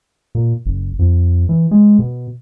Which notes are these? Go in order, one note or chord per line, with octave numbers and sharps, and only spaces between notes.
A#2
F#1
F2
E3
G#3
B2